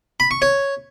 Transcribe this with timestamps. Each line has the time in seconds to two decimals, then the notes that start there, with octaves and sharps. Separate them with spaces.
0.20 B5
0.31 C#6
0.42 C#5